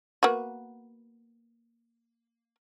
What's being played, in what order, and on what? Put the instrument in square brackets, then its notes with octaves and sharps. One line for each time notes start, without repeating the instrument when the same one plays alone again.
[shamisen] A#3 B3 F#4